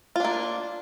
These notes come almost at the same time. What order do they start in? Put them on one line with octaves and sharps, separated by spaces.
F4 D4 A#3